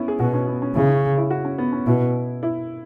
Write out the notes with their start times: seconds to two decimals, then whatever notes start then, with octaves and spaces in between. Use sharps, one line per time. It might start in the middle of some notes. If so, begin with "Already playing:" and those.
Already playing: B3 C#4 E4
0.08 G#4
0.20 B2 F#4
0.34 C#4
0.47 B3
0.62 C#4
0.75 C#3 E4
0.89 C#4
1.17 E4
1.30 F#4
1.45 C#4
1.58 B3
1.72 C#4
1.87 B2 E4
2.43 E4